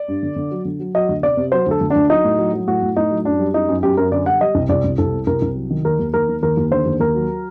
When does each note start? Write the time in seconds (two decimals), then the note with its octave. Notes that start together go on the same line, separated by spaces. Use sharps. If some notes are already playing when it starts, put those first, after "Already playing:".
Already playing: D5
0.08 G2
0.23 D3
0.36 D3
0.51 F#3
0.65 D3
0.80 F#3
0.95 F#3 D#5
1.09 D2
1.23 C3 D5
1.37 C3
1.52 F#3 C5
1.67 D2 A4
1.81 D2
1.90 D4
1.96 D2
2.10 F#3 D#4
2.24 A2
2.39 F#3
2.53 F#3
2.67 A2 F#4
2.82 A2
2.96 A2 D#4
3.11 F#3
3.25 F#2 D4
3.39 G3
3.54 F#2 D#4
3.69 F#2
3.83 F#2 G4
3.97 F#2 A#4
4.12 D3 D5
4.26 G3 F#5
4.40 G3 D#5
4.55 C2
4.69 C2 D5
4.84 C2
4.98 C2 A4
5.13 C3
5.27 C2 A#4
5.42 C2
5.56 F#3
5.70 D#3
5.85 D#2 A#4
5.99 D#2
6.14 D#2 A#4
6.29 D#3
6.43 D#2 A#4
6.57 D#2
6.71 D3 C5
6.86 D#2
7.00 D#2 A#4
7.15 F#3